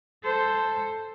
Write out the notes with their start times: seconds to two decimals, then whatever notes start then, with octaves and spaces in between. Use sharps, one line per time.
0.24 A4 C5